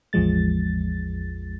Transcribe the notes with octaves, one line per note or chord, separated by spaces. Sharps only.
A1 E2 F3 G#3 A6